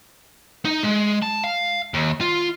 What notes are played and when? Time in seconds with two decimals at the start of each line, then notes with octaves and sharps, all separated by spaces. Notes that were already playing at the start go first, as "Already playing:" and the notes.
0.65 D#4
0.83 G#3
1.22 A5
1.44 F5
1.94 D#2
2.21 F4